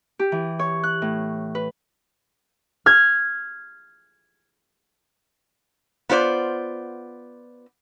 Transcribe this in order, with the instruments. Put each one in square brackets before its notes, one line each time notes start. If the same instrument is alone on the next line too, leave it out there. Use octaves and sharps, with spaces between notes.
[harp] G4
E3
C#5
F#6
A2
B4
F6 G#6
[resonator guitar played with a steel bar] B3 F4 C5 D5